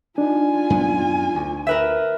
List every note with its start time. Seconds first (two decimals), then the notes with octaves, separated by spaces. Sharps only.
0.18 D4 D#4 F4 G#5
0.70 F#2 B3
1.35 D2
1.67 A#4 B4 E5